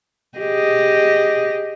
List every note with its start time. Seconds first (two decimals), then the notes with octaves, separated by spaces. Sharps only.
0.39 G4 G#4 D#5